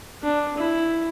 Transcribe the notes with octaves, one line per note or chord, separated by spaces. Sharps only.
D4
E4